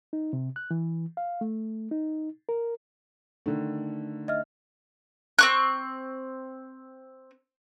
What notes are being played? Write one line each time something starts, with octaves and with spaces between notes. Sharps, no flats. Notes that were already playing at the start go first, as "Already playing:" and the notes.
D#4
C3
F#6
E3
F5
A3
D#4
A#4
D3 D#3 A3
D#5 E5 F6
C4 C#6 F#6